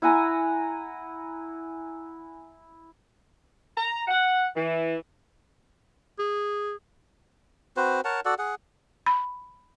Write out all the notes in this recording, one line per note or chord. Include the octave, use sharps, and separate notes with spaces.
E4 F#5 G#5 A#5
A#5
F#5
E3
G#4
C4 F#4 B4 C5
A#4 C#5 F#5 A5
F#4 A4 D5 F#5
G#4 F#5
B5